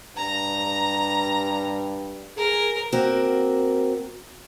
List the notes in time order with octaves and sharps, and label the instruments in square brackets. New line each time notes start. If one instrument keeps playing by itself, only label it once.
[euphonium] G2 [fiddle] A#5
[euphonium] G#4 [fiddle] A#4
[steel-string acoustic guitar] A#3 C4 F#4 A#4